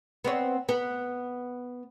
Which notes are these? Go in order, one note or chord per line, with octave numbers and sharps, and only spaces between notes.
B3 C4 C#5
B3